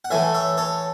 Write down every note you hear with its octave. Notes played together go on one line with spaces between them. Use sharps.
F#5
A2 E3 A3 E5 G#5
C#5 E5
A4 C#5